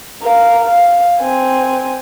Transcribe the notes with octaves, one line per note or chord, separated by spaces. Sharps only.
A#4 F5
F5
C4 G#5